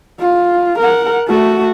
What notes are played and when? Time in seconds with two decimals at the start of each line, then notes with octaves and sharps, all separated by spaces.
0.20 F4
0.79 A#4 F#5
1.28 A3 F#4